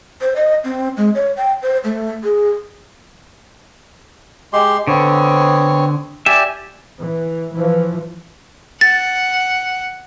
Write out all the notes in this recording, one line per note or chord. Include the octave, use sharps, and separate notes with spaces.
C5
D#5
C4
G#3
C#5
G5
C5
A3
G#4
G#3 G4 C6
D3 B3 C4 C#5
G4 D5 E5 G#5
E3
E3 F3
F#5 A6